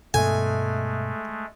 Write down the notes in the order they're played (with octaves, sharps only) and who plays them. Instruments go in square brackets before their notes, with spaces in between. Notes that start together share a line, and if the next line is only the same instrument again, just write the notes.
[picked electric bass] G2 B2 [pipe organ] G#3 A3 [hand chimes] A4 E5 [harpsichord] G#5